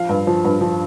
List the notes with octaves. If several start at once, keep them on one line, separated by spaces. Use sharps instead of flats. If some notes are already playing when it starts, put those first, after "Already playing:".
Already playing: F3 F5
G2
F3
G2
F3